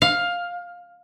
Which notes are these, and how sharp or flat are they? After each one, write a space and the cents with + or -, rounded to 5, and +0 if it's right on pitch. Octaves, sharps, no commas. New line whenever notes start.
F5 +10